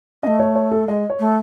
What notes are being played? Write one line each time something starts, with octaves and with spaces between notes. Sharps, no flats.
A3 C#4 D#5
C#5
C#5
A4
G#3 D#5
C#5
A3